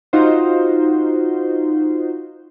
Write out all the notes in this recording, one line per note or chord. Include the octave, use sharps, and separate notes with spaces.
D#4 F4 F#4 C5